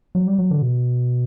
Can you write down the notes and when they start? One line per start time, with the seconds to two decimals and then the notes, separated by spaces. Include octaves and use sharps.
0.15 F#3
0.27 G3
0.38 F#3
0.51 D3
0.62 B2